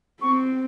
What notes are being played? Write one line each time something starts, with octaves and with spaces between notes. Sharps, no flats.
C4 C#6